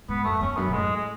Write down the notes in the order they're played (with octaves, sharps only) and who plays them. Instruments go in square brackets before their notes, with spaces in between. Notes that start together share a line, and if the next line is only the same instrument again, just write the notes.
[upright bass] G#2 [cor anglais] B3
[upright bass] F#2 [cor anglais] A3
[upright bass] E2 [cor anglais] C#4
[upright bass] F#2 [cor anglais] B3
[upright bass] B2
[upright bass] A2 [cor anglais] G#3
[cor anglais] G#3